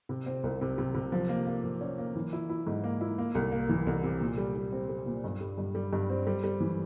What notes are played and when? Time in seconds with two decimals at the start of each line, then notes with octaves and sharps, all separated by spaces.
0.09 C3
0.26 C4
0.44 C2
0.61 C3
0.78 C3
0.94 C3
1.12 F3
1.29 A#3
1.47 A#3
1.64 F3
1.81 C#4
1.98 A#3
2.15 E3
2.33 E4
2.49 E4
2.67 G#2
2.84 A#3
3.01 E4
3.18 A#3
3.35 C2
3.52 A#3
3.69 E3
3.87 C2
4.04 C3
4.21 A#2
4.38 G3
4.56 G3
4.72 C4
4.89 G3
5.06 A#2
5.24 G2
5.41 G3
5.58 G2
5.75 G3
5.93 G2
6.10 C4
6.27 G3
6.44 G3
6.60 E3